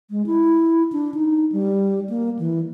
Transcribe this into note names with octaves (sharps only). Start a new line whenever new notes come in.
G#3
E4
D4
D#4
G3
A#3
E3